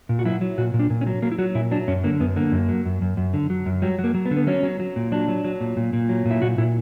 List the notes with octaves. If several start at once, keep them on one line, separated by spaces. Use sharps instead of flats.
A#2
F#4
F#3 E4
F#3
A#2 F#4
A#2
D4
A#2
C#4
F#3
F#3 A#3
E4
F#3 F#4
A#2 E4
F#3 D4
F#2 C#4
D3 A#3
F#2 B3
D3 A#3
F#2
F#3
F#2
F#2
F#2
D3
F#3
F#2
F#3 G3
F#3
A#3
F#3
B3
D3
B3
F#3 C#4
F#3
F#3
A#2
F#3 D4
F#3
F#3
A#2
A#2
A#2
F#3
A#2
E4
A#2 F#4
A#2 E4